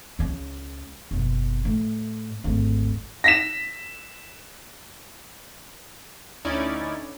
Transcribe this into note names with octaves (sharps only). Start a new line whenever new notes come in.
C#2 C#4
F#1 B2
A2
G#1 D2
A#6 B6 E7
D2 C#4 D#4 E4 D5 G#6